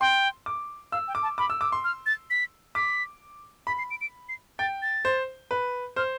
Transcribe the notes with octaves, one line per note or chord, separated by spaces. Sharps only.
G5 C6
D6
F5 E6
G5
D6
A5
B5 D6
E6
D6 E6
C6
F6
A6
B6
D6 B6
B5 B6
C7
D7
D7
C7
G5 A6
A6
C5
B4
C5 F6